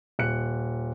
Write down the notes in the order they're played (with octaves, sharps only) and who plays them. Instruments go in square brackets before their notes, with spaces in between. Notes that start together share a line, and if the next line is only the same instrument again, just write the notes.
[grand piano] D#1 F#6 C#7